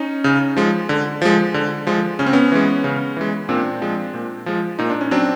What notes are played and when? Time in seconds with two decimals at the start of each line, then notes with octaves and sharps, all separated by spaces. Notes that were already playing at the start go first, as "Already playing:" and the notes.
Already playing: C#4 D#4
0.24 C#3
0.56 F3 G#3
0.89 D3
1.22 F3 G#3
1.54 D3
1.87 F3 G#3
2.19 C#3 C#4
2.26 C4
2.33 B3 C#4
2.52 E3 G#3
2.84 C#3
3.17 E3 G#3
3.49 A#2 C4 D4
3.82 F3 G#3
4.14 A#2
4.46 F3 G#3
4.79 A#2 D#4
4.90 D4
5.01 C#4
5.11 F#3 C4 D4